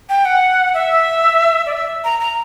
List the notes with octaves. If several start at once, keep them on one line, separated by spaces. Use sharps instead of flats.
G5
F#5
E5
D5
E5
A#5
A#5